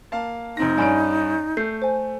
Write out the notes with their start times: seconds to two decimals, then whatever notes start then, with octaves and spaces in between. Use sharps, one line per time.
0.12 A#3 F5 A5
0.57 F1 C4 D#4 A#6
0.78 G2 C#4 D5 G#5 B5 D7
1.57 A3 A4 G6 C7
1.82 C5 G#5